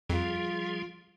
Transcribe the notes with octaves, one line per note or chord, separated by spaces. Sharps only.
F2 F3 G3 F4 G#4